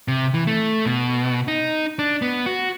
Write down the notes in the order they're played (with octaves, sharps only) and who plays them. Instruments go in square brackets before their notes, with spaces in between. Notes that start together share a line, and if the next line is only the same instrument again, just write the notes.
[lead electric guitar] C3
E3
A3
B2
D#4
D4
B3
F#4